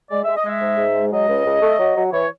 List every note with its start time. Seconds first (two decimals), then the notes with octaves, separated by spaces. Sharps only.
0.10 G#3 D5
0.23 G#3 E5
0.36 D#5
0.45 G#3 E5
0.61 G#2
0.77 G#2
0.94 G#3
1.12 F#3 D#5
1.28 C#2
1.45 C#2
1.62 A3
1.79 F#3
1.96 F#3
2.12 E3 C#5